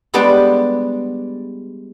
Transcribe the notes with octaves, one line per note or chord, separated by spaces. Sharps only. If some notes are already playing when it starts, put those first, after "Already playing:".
G3 G#3 B3 D4 G4 D5